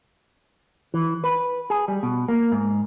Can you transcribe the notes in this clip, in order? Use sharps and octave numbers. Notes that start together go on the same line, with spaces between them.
E3
B4
G#4
G3
B2
A#3
G#2